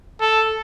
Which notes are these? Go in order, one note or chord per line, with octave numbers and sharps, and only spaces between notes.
A4